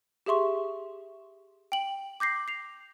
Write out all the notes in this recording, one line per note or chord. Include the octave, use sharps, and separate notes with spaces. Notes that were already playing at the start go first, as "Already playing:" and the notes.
G4 G#4 E5 C6 C#6
G5 F#7
D6 G6 A#6 C7
C7 F7